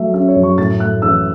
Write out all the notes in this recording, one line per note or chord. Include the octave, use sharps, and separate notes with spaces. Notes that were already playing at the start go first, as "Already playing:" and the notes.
Already playing: F#3 A3 E5
C#4 E5
C#5
F#2
C#6
A2 A6
A3 F#6
A1 E6